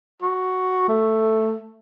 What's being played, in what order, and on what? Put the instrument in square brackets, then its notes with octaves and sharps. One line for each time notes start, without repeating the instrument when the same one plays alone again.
[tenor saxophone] F#4
A3